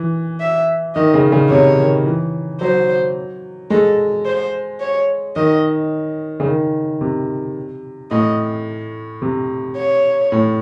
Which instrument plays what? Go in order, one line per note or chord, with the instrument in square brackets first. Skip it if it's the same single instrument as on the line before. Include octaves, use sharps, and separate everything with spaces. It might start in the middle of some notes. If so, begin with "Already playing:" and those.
Already playing: [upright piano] E3
[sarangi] E5
[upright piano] D#3 [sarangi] D#5
[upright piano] C#3
C#3
[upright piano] C3 [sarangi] C#5
[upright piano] D#3
E3
[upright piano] F#3 [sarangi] C5
[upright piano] G#3 [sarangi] A4
[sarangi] C5
C#5
[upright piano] D#3 [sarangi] D#5
[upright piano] C#3
D#3
C3
[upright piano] A2 [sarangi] D#5
[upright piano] C3
[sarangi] C#5
[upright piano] A2